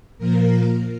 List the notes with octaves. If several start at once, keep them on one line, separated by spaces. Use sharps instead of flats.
A#2 F3 A#3 A#4